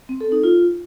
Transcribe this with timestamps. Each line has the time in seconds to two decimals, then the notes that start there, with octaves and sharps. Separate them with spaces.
0.09 C4
0.21 A4
0.32 D#4
0.43 F4